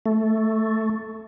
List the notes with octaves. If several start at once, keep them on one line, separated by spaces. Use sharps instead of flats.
A3